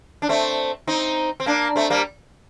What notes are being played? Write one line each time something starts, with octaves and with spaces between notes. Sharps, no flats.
D4
A3 C4
C4 D#4
C4
A#3 D4
A3 C4
G3 A#3